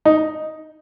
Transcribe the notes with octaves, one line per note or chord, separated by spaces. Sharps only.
D#4